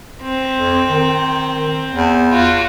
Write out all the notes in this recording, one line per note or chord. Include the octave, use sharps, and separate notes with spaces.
C4
F2
D#3
E2
F4 F#4